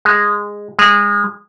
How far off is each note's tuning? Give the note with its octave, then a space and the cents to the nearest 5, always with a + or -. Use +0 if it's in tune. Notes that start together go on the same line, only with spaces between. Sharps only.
G#3 -10
G#3 -25